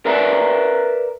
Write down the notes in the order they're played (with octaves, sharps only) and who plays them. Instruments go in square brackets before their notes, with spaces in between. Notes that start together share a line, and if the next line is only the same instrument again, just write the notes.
[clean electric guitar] A#4 B4 D5 E5 A#5